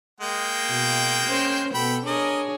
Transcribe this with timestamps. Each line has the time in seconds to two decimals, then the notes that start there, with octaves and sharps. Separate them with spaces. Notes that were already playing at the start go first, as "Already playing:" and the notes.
0.20 G#3 A#3 G5
0.67 B2
1.27 C#4 A#4 C5
1.74 B2 B3 A4 G5 B5
2.06 D4 G#4 A#4 C#5 D#5